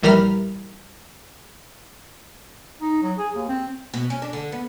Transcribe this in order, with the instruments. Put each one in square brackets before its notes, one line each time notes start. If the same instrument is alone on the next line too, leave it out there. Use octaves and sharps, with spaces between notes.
[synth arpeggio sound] A#1 E3 G3 A#4 B5 F6
[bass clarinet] D#4
F#3
G#4
D#2
C4
[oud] B2
C#4
D4
D3
B3